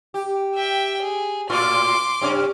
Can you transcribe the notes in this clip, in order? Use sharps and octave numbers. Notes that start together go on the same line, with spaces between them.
G4
E5 G5
G#4
A2 F4 C6 D6
F#2 C3 C#4